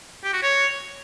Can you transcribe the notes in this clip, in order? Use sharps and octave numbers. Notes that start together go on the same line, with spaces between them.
G4
F#4
C#5